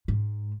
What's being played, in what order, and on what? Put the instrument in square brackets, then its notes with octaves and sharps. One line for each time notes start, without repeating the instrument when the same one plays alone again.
[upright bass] G#2